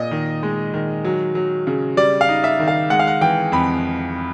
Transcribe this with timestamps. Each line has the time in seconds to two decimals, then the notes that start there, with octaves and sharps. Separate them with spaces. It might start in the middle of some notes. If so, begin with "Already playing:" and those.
Already playing: A#2 D#5
0.11 D#3
0.43 G#3
0.74 D#3
1.04 F#3
1.35 F#3
1.67 C#3
1.97 G3 D5
2.21 F5
2.29 D#4
2.44 E5
2.59 D#3
2.68 F5
2.90 G#3 F#5
2.99 F5
3.07 F#5
3.21 E3 G5
3.52 F2 B5